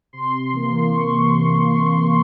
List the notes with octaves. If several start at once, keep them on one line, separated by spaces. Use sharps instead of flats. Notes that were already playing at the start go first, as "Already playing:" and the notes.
C3 C6
E3 A#3
C3 C#6